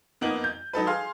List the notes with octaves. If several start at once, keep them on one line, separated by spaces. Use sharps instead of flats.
F2 A#3 B3 D#4 F#7
G6
F#3 D#4 A4 B4
G#4 F5 C6